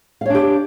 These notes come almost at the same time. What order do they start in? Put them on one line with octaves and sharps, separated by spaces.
F5 C#5 D4 G4